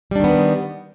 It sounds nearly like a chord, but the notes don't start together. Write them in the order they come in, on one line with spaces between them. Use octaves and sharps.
G3 D4 D#3 B3